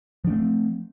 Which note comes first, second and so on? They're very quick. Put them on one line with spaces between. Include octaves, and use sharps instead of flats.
F3 D4 A3 C4